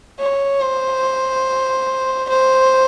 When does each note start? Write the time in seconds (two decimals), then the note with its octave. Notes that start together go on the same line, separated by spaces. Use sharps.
0.19 C#5
0.61 C5
2.29 C5